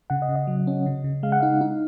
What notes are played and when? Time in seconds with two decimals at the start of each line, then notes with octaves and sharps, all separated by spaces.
0.10 C#3 F#5
0.22 D#5
0.29 C#3
0.36 D#5
0.47 F#3
0.67 C#4
0.86 C#3
1.04 C#3
1.23 G#3 F5
1.32 F#5
1.40 D#4 F5
1.61 D#4